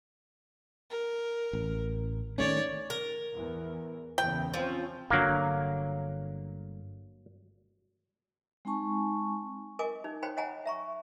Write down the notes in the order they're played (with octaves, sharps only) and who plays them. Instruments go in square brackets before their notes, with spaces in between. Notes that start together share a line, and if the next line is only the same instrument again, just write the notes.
[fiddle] A#4
[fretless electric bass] A1
[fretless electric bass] D#3 A3 C#4 [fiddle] C#5 D5
[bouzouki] A#4
[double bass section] E2
[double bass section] E2 C#3 [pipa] G5
[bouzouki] F3 [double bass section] C4 C#4
[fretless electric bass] G1 D3 [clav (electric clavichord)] F#3 A#3
[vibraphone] G#3 C4 D#4 G#5 A5 C#6
[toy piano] A#4 D#5 G#5 D6
D#4
D#4 C5 C#5 G5 B5
C#5 D#5 F#5 G#5 A#5
E5 A#5 C#6